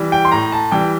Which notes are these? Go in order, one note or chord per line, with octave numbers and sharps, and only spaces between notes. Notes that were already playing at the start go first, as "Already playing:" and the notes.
Already playing: E3 G3
G5
C6
A2 A#5
A5
E3 G3 G5